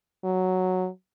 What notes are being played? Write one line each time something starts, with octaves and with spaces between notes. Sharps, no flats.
F#3